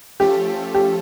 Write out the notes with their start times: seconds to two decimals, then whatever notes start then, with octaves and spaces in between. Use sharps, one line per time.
0.20 F3 A3 C#4 F4 G4 A4
0.74 G4